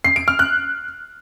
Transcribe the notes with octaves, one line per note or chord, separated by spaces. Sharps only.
C7
D7
F6
F#6